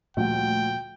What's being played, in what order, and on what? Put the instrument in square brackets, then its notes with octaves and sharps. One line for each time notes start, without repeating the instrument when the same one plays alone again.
[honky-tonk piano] D2 F#5 [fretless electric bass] A#2 F3 G3 [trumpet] G5